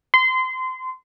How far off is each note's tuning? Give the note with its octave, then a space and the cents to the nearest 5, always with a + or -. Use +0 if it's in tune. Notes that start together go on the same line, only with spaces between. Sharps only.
C6 -25